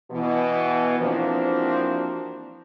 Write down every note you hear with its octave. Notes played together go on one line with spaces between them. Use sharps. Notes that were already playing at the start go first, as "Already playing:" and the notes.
B2 E3
E3 F3 A#3 C4 D4 F#4